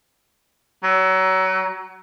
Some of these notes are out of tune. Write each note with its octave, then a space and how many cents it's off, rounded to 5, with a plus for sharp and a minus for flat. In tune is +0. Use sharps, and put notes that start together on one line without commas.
F#3 +30